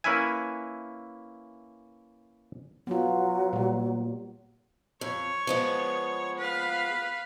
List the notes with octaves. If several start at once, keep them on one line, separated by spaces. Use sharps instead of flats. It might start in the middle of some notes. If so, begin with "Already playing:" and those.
A#3 C#4 E4 B4 E5 G#5
F#3 B3 F4
A#2 G3
F2 C#5
F3 G#3 B3
B4 F5